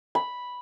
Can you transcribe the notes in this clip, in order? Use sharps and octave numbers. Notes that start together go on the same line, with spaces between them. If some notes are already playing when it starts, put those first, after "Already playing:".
B5